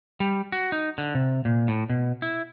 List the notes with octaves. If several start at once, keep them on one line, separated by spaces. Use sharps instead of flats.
G3
F#4
D#4
D3
C3
A#2
A2
B2
E4